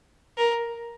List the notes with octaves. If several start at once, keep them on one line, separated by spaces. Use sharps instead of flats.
A#4